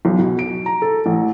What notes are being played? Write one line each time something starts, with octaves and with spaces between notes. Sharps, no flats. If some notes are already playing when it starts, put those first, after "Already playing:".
B1
B2
D7
A#5
A4
A1